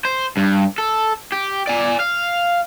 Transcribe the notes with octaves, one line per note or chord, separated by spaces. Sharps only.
C5
G2
A4
G4
D5 G#5
F5